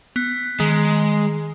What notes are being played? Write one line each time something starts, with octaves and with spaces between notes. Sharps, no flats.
B3
D#3 G#3